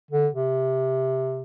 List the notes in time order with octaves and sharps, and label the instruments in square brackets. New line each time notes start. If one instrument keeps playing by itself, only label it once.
[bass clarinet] D3
C3